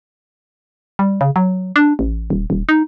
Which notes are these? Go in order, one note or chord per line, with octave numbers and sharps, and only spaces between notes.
G3
C#3
F#3
D4
A1
D#1
D#1
D#4